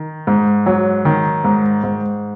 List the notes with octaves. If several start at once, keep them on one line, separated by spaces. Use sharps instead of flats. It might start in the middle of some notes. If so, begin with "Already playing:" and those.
Already playing: D#3
G#2
F#3
D#3
G#2
G#2